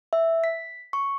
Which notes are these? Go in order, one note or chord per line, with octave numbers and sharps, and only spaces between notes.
E5
B6
C#6